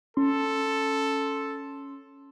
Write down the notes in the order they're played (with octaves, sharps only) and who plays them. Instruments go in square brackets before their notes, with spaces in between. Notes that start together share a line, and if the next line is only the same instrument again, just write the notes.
[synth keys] C#4 C6 [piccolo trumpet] A4